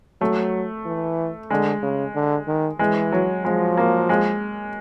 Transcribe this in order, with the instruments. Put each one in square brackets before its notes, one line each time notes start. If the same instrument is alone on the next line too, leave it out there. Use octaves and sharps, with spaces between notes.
[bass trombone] F#3 [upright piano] A3
[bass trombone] E3
[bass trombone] D3 [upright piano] G#3
[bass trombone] C#3
D3
D#3
[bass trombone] E3 [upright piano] G#3
[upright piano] F#3
[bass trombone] F3 [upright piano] G#3
[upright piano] A#3
G#3